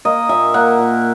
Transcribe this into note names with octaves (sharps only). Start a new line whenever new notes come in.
A#3 D#5
A#2 E5
A#3 F#5
A#2